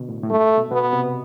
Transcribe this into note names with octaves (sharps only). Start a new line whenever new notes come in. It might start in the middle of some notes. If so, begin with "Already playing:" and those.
Already playing: B2 D3
A2
A2
G2 A3
B2
B2 B3
C3